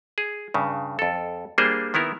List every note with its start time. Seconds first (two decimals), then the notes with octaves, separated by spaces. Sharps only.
0.18 G#4
0.54 G2 C#3
0.99 F2 A4
1.58 G3 A#3 D4 G#4 C5
1.94 D#3 B3 E4 A#4